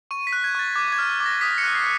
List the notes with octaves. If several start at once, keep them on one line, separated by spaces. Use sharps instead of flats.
C#6 D#7
B6
F#6
G#6
C#6 A6
D6 G#6
G#6
F6
D6
A#6
D#6 B6
C#7
F#6
C7